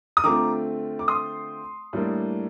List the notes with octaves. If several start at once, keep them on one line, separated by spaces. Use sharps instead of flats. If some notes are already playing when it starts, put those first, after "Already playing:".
D#6
D3 A3 C4 F4 A#5 D6
D6
C6 D#6
A2 G3 A#3 D4